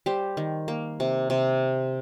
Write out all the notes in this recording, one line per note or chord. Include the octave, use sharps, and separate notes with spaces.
G3 G4 C5
D#3
A#3
C3
C3